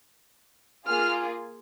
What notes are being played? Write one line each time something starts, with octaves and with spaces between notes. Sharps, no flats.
A#3 F4 G#4 F6